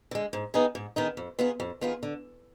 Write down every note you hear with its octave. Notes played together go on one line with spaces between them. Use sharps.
D3 G#3
G#2
D#3 B3 D#4 G#4
G#2
D#3 B3 D#4 G#4
F2
D#3 B3 F4 G#4
F2
D#3 B3 F4 G#4
D3